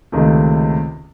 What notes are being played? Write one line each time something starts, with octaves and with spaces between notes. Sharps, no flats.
C#2 C3 D#3 A3